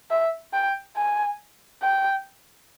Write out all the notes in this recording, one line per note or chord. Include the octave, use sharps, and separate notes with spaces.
E5
G5
G#5
G5